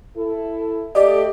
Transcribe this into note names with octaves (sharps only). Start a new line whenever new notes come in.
E4 A4
A3 G4 A4 D5 D#5